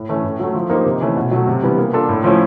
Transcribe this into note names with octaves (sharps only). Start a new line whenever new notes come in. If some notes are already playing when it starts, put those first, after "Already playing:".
Already playing: A2
E3 A3 C#4
A2
F#3 A3
F3
A#3 D#4 G4 C5
C3
E3 A3 C#4
B2
F#3 A3
C3
E3 G3 B3
A#3
D4 F4 A4
A2
F3 A3 C#4 E4